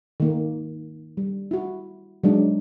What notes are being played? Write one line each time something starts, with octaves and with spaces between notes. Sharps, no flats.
D#3 A#3
G3
E4 F#4
F#3 G#3 D4 D#4